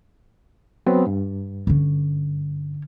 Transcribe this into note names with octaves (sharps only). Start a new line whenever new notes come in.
F#3 B3 C4
G2
D3 C#4